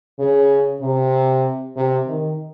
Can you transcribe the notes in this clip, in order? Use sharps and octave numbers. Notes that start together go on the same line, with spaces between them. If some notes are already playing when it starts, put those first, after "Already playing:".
C#3
C3
C3
D#3